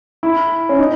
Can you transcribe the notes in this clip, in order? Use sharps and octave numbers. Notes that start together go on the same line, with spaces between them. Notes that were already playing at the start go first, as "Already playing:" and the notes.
E4
C#4
D#4